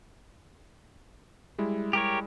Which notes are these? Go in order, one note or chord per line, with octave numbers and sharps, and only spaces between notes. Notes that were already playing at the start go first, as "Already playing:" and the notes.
G3 G#3 E4
G4 A#4 C#5